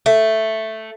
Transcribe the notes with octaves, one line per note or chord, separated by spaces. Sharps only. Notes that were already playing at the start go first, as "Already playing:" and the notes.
A3